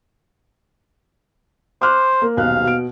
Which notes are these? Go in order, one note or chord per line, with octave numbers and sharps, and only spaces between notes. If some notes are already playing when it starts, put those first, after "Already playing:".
C5 D6 F6 F#6
A#3
D#1 B1 F5 F#6
B2 D7